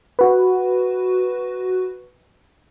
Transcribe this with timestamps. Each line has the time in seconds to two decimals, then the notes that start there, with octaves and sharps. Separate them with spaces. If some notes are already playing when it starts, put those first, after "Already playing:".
0.19 F#4 B4